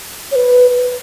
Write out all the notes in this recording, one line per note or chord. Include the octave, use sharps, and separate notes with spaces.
C#5
B4